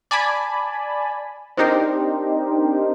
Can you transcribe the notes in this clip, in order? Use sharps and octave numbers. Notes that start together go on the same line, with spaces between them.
D5 G#5 A5 B5
C4 D4 D#4 G4 A#4 C5